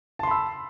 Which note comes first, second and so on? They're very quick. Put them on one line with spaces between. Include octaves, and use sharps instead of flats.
A5 C6 B5 E6